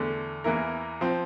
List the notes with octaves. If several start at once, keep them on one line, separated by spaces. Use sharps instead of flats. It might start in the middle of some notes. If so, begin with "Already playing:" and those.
Already playing: E2 D3 A3
E2 E3 A#3 E4 A#4
F3 C4